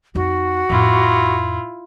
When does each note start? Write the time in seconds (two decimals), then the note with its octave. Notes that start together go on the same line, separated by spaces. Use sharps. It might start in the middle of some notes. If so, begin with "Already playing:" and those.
0.15 F2 D#4 F#4
0.70 F2 A2 E4 F4